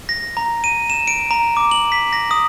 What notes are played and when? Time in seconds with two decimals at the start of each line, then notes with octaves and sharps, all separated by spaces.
0.09 A#6
0.37 A#5
0.64 D#7
0.90 E7
1.07 D7
1.31 A#5
1.57 D6
1.71 F#7
1.92 B6
2.13 A#6
2.31 D#6